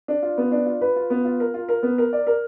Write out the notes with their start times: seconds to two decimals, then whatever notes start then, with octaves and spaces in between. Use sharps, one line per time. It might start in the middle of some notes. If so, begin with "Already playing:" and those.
0.08 D4
0.23 F4
0.38 B3
0.52 D4
0.66 F4
0.81 B4
0.96 F4
1.10 B3
1.25 F4
1.40 A#4
1.54 F4
1.68 A#4
1.83 B3
1.98 A#4
2.13 D5
2.27 A#4